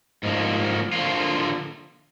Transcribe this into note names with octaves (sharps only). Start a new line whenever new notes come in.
G#2 F3 A#3
D3 F3 A#3 F4